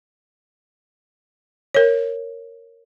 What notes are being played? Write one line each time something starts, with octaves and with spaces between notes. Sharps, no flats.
A#4 C#5